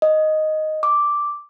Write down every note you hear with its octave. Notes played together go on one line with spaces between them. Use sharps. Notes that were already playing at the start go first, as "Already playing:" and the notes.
D#5
D6